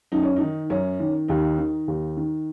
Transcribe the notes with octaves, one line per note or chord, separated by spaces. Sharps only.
F#2 D#4
C#4
D#4
D#3
F#2 C#4
D#3
D#2 D#4
D#3
D#2
D#3